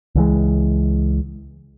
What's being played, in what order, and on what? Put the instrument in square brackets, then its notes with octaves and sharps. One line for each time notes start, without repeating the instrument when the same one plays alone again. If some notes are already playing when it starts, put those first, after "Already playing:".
[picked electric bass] C#2 E3 G#3